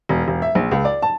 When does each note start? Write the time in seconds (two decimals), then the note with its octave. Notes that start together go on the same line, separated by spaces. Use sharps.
0.09 E1
0.28 E1
0.42 E5
0.55 A#1
0.71 C#2
0.85 D5
1.02 A5